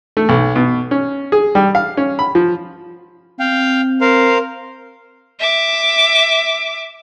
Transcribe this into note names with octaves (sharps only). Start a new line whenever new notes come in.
A3
B1
B2
C#4
G#4
G3
F5
C#4
B5
F3
C4 F5 G5
A#4 C5 F5
E5 D6